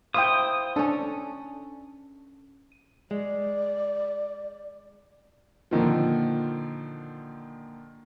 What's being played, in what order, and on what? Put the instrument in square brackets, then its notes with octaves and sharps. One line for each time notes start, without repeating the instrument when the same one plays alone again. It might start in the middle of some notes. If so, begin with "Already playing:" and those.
[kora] E4 C5 [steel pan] F5 G5 [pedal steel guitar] D#6
[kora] C#4 A4 [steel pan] D4
[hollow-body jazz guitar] G#3 [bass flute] D5
[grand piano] A#2 D3 D#3 F3